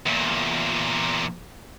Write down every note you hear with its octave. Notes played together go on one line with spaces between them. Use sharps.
E2 A#2